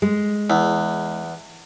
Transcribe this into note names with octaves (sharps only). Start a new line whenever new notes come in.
G#3
E2